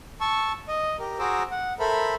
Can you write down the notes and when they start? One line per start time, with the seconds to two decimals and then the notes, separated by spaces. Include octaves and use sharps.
0.21 A5 C#6 E6
0.68 D#5
0.99 G4 A#4
1.19 F#4 G#4 C5 A#5 D6 E6
1.51 F#5
1.80 A4 A#4 C5 E5 B5